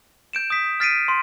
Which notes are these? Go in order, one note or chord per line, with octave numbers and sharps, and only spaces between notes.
G6 D7 E7
D#6 G6 B6
F6 A6 B6 C7 D7 D#7
C6